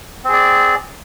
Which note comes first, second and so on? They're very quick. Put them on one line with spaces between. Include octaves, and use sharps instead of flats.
C4 G#4 D5